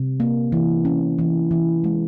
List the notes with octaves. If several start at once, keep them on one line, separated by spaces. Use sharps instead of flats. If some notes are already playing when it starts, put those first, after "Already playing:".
Already playing: C3
A#3
E3
C#4
E3
E3
G#3